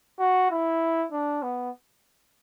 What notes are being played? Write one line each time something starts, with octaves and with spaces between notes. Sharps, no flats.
F#4
E4
D4
B3